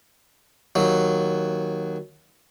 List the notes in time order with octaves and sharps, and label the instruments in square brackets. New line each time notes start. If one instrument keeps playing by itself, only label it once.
[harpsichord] D#2 F#3